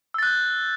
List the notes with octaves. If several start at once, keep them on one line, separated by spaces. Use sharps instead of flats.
E6 F#6 G6 A6